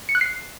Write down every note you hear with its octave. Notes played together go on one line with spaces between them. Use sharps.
C#7
F#6
C7